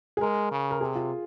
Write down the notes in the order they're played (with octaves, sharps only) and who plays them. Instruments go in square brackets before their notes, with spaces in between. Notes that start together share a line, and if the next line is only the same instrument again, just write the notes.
[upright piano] G#4
[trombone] G#3 [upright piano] A#4
[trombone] C#3
[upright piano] A#4
[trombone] C3 [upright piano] G#4
[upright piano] F4